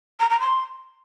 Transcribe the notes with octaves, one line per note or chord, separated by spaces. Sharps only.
A#5
A#5
C6